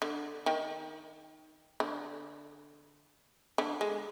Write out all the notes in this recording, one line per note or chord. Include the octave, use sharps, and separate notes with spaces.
D3
D#3
D3
D3
G#3